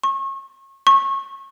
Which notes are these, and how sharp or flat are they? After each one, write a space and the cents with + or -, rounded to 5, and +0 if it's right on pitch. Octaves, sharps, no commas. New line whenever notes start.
C#6 -35
C#6 -25